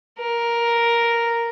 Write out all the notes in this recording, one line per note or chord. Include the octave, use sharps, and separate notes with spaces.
A#4